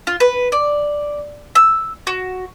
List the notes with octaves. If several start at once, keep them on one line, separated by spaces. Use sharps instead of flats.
F4
B4
D5
E6
F#4